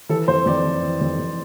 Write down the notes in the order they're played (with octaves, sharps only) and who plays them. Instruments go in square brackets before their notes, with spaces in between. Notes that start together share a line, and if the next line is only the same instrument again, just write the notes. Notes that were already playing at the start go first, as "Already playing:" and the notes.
[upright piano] E3 A4
F2 C5
F2 D5
E3
E3
F2
F2